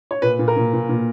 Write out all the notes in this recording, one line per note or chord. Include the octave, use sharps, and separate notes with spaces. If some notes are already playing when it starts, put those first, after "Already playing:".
C#5
A#2 B4
A#2
A#4
A#2
A#2
A#2